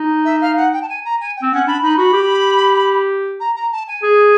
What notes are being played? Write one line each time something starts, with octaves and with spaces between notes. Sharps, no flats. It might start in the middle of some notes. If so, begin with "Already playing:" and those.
Already playing: D#4
E5
F5
F#5
G5
A5
G#5
A#5
G#5
G5
C4
C#4 F#5
D4 B5
D#4 B5
F#4 B5
G4
A#5
A#5
A5
G#5
G#4